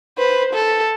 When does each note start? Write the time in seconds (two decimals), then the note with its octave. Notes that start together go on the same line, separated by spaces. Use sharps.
0.18 B4 C5
0.53 A4